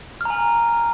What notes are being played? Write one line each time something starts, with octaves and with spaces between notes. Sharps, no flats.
G#5 A#5 F6